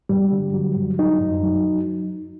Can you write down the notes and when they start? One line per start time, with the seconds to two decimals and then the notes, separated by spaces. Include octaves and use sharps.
0.09 G2 G3
0.32 D3
0.54 F#3
0.76 G2
0.99 F#3 D#4
1.21 F#2
1.43 F#3